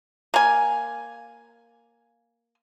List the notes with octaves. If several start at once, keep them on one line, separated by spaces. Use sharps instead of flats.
A#3 G#5